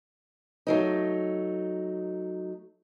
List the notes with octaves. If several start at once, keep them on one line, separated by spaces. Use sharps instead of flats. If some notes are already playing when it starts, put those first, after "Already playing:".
F#3 A3 D#4